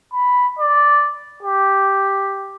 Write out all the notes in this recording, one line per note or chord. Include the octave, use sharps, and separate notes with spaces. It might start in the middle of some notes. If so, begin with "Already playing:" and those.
B5
D5
G4